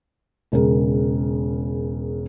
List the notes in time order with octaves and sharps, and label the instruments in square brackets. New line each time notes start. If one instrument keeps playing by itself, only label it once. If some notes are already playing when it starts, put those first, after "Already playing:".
[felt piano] E1 C#3 A#4